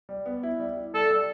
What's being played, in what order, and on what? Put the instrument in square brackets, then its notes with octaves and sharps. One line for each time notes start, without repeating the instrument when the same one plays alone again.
[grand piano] G3
B3
E4
G3
E4
[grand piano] G3 [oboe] A4
[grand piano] G3